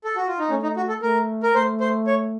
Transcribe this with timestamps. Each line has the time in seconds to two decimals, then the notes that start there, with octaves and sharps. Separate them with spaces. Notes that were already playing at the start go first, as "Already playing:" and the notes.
0.04 A4
0.16 F#4
0.28 F4
0.39 D#4
0.49 A3 C#4
0.63 D#4
0.77 F#4
0.89 A4
1.02 A3 A#4
1.43 A#4
1.55 A3 C5
1.81 C5
2.07 C#5